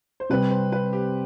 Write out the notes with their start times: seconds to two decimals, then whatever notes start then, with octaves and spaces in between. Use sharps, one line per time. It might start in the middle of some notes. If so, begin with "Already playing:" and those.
0.20 C5
0.30 C3 G3 C4 B4
0.51 C5
0.72 B4
0.93 G4